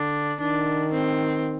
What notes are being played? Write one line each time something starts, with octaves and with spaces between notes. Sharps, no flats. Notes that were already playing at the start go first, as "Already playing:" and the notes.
Already playing: D3 D4
D#3 D4
C4